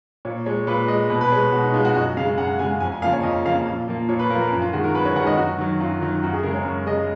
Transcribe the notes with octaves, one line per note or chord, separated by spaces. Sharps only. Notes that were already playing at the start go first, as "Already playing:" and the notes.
A#2 C#5
G#3 C#5
A#2 B4
G#3 D#5
B2 B4
B4
G#3 C#5
B2 F#4
D#4
G#3 F4
F#4
F#2 D#5
C#3 G#3 F5
F#2 F#5
C#3 G#3 G#5
F2 G#5
G#5
C#3 F3 A#3 F5
C#5
F2 D#5
C#3 F3 A#3 F5
A#2
F3 A#3
A#2 C#5
B4
F3 A#3 A#4
A#4
F#2
F4
D#3 G#3 F#4
A#4
F#2 B4
C#5
D#3 G#3 F#5
D#5
F#2 F#4
D#3 F#3
F#2 F4
D#3 F#3
F#2 F#4
G#4
C#3 G#3 A#4
C#5
F#2
C#3 G#3 D#5